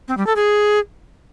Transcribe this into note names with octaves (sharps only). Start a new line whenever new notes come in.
C4
G3
A4
G#4